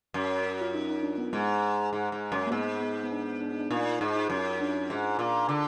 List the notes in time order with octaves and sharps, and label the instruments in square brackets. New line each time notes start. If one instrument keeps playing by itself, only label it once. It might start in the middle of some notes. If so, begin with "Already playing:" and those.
[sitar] F#2
[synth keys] F4
D#4
D#4
D4
B3
[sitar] G#2 [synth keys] G#3
[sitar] G#2
G#2
F#2
[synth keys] A#3
[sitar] G#2 [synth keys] B3
[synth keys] B3
B3
D4
D4
D#4
D4
[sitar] A#2 [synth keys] D#4
[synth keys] F4
[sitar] G#2 [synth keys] D#4
[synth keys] D#4
[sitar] F#2 [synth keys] D#4
[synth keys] D4
[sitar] G#2
A#2
D3